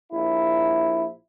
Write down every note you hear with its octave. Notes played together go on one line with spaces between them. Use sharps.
A#1 E4